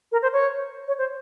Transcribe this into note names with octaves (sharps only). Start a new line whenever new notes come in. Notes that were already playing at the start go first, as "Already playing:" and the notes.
A#4
C5
C#5
C#5
C5